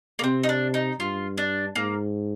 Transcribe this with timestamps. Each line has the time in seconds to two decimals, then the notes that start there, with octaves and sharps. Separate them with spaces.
0.19 A#3
0.23 C3 C4
0.43 D#4
0.49 D4
0.74 D#4
1.00 G2 F4
1.38 D4
1.76 G#2 A#3